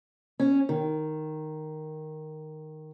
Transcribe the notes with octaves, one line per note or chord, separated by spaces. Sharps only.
C#4
D#3